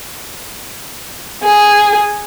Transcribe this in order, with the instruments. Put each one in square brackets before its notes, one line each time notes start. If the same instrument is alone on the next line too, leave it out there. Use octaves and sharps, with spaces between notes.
[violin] G#4